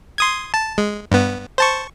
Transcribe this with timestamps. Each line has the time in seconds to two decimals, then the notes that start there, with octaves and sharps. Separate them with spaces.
0.18 C6 D#6 G#6
0.54 A5
0.78 G#3
1.11 G2 B3
1.58 C5 A5 C#6